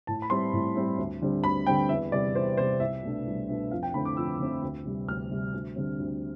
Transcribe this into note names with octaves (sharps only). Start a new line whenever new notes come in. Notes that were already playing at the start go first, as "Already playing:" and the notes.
A2 A5
B5
G3 C4 E4 C6
A2
G3 C4 E4
D2
D3 G3 C4
D2 B5
D3 G3 C4 G5
E2 E5
C3 G3 D5
E2 C5
C3 G3 C5
C2 E5
B2 A3 D4
C2
B2 A3 D4
F2 F5
G5
D3 A3 C4 E4 B5
D6
F2 E6
D3 A3 C4 E4
D2
C3 G3
D2 F6
C3 G3
D2
D3 G3 C4
D2